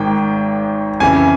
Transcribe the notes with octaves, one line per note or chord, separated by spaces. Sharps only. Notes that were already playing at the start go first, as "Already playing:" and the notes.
Already playing: G#1 G#2 D#3 G5
F2 C#3 E3 G#5